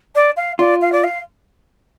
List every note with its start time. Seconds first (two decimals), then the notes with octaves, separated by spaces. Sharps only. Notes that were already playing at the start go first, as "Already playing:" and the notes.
0.15 D5
0.36 F5
0.59 F4 D5
0.81 F5
0.92 D5
1.03 F5